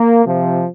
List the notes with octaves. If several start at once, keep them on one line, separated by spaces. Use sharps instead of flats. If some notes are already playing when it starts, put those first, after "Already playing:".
Already playing: A#3
C3 F3